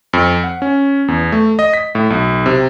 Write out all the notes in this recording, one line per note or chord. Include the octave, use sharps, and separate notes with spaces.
F2
F#5
C#4
E2
A3
D#5
B6
A2
B1
C3